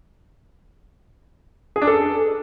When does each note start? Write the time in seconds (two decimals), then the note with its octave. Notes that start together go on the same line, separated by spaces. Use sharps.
1.76 G#4
1.82 D4
1.87 A4